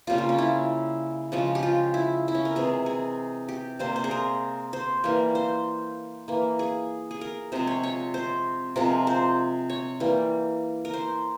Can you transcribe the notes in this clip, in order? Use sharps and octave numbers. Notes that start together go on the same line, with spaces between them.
C#3 G3 A#3 F4
F4
C#4
E4
C#3 F3 G#3
G4
F4
E4
E4
C#4
A#4
C3 E3 G#3 G#4
G#4
G4
C3 G3 A#3 C5
C5
G#4
A#4
C5
E3 G3 A#3
C5
E3 A#3
G#4
G#4
A#4
C3 F3 G#3 C5
C#5
C#5
C5
C3 F3 G#3 A#4
C5
C#5
E3 G3 A#3
A#4
C5